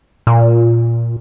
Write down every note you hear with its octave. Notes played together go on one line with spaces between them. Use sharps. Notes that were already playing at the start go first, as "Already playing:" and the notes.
A#2